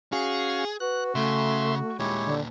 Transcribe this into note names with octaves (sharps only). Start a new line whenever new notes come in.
C#4 F#4 G#4 F5
F#4 B4 F#6
C#3 A3 E5 C6
D#2 A#2 G#3 E4 G4 C#5
D3